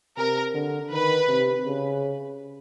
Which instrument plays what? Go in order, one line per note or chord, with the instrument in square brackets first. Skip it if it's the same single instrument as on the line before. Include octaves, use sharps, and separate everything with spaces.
[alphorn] C3 [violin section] A#4
[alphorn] D3
[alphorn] D#3 [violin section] B4
[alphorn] C3
C#3